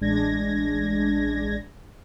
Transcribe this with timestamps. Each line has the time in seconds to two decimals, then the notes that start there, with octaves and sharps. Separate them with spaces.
0.01 A1 G#3 D4 G#6 A#6